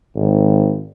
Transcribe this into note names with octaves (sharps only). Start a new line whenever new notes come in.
G#1